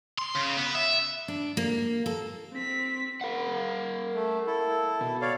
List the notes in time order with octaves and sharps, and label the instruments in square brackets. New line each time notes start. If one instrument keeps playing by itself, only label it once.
[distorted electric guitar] C6
C#3
B3
E5
[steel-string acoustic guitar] D4
A#3
A4
[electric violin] C4 B6
[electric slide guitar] A#4 F5 F#5
[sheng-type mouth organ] A3
E4 A4
[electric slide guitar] B2
[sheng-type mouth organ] C#5 D5 F5